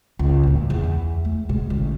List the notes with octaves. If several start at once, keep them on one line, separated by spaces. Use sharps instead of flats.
C#2
D2 A#2
E2
A3
B2 G#3
A1 D2